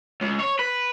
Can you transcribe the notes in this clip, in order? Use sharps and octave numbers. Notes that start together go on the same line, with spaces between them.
C#2
C#5
B4